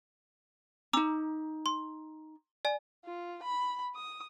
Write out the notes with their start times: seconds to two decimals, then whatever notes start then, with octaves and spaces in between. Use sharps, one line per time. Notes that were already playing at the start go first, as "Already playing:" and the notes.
0.93 C#4 D#4 A#5 D6 E6
1.66 C6
2.65 D5 G#5
3.05 F4
3.43 B5
3.95 D#6